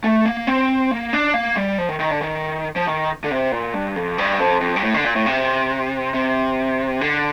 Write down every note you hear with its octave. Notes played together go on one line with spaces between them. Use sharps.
A3
A#3
C4
A#3
D4
A#3
G3
F3
D#3
D#3
D3
D#3
F3
D#3
D3
C3
A#2
G2
F2
G2
F2
F2
G2
A2
D3
A#2
A2
C3
C3
D3